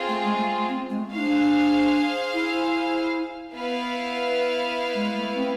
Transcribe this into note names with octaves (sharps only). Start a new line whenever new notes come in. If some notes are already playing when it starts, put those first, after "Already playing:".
Already playing: C4 F4 G#4
A3
G#3
A3
C4
G#3
A3
D4 E4 G#4 C5 F5
E4
B3 E4 B4 F5
G#3
A3
C4